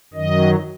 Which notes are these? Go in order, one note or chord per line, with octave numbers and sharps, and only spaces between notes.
F#2 D#3 F#3 D#5